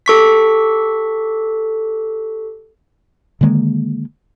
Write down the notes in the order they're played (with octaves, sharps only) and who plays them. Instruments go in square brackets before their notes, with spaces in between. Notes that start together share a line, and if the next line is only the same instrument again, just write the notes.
[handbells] G4 A4 C#6 B6
[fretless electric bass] D3 D#3 G#3 A#3